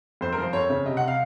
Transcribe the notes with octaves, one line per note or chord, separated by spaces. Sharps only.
F2 C5
A#4
F3
C5
F2 C#5
C#3
C3 D#5
C3 F#5
F5